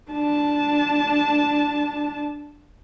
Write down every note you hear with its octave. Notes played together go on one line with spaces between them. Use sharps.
D4 A5